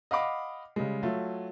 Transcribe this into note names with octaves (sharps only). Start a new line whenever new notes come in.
D#5 F5 F#5 B5 D6
C#3 G3 G#3
F#3 A3 F4